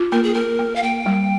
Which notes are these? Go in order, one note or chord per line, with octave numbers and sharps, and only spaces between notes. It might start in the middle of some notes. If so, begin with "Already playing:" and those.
Already playing: F4
A#3 A#4
G#4
A#3 A#4
A#3
F5
A#3 G5
G3